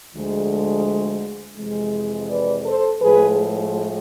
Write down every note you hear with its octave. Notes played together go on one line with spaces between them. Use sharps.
D2 D3 F3 G#3
F2 C3 E3 G#3
B4 D5
A4 C5
A2 F3 G#3 G#4 B4